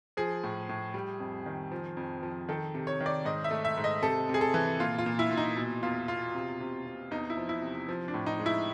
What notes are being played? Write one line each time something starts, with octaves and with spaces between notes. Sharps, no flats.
F3 G#4
A2
A2
G3
F2
D#3
F3
F2
F3
D#3 A4
C3
C#5
D#3
D5
G#2 D#5
E5
A3
E5
G#2
D#5
C3 A4
C3
G#4
A4
E3
A#2 F4
F4
A#2
E4
A#2
D#4
B2
E2 F4
B2 F4
C3
C3
C3
E2 D#4
E4
F3
E4
C3
F3
D4
A2
D#4
G#3
E4